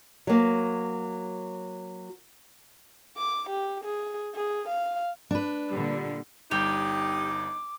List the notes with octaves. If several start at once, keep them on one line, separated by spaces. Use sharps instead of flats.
F#3 A#3
D6
G4
G#4
G#4
F5
D4 B4
A#2 D3 G3
G1 G3 D#4 G4 D6